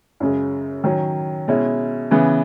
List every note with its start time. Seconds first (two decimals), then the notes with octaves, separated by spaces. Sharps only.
0.20 F#2 C#3 G#3
0.84 D#3 F#3 C#4
1.48 B2 G#3 C#4 E4
2.11 C#3 E3 B3